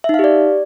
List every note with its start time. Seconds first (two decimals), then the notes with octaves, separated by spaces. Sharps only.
0.04 E5
0.09 D#4
0.14 F5
0.19 G4
0.24 D5